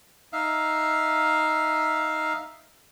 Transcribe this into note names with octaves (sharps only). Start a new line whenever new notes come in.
D#4 E5 F5